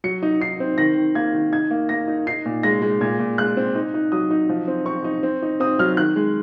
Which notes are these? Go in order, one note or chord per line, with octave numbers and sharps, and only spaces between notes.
F#3 C#7
D#4
D#4 C7
C4
D#3 A#6
D#3
A#3 G#6
D#3
D#4 G#6
A#3
A#3 A#6
D#4
D#4 C7
A#2
G#3 A#6
G#3
A#2 G#6
A#2
G#3 F#6
C4
D#4
D#4
F#3 D#6
D#4
F3
C4
C4 C#6
D#4
C4
D#4
C4 D#6
F#3 F6
D#3 F#6
G#3